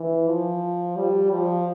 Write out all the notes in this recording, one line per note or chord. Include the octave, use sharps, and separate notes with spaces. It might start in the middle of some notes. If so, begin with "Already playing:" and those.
Already playing: E3
F3
G3
F3